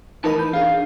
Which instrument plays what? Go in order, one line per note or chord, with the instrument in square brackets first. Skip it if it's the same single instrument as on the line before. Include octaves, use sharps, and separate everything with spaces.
[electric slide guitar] E3 B4 A5 [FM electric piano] D#4 A#4 B5
[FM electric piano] G6
[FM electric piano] D4 G#4 [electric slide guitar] F5